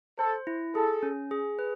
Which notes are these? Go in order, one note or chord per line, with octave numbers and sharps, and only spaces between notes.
A4 C5
E4
G#4 A4
C#4
G#4
B4